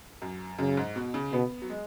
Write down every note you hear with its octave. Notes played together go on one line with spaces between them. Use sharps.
F#2
F#2 C#3
G#2
B2
C#3
B2 B3
F#3
G#3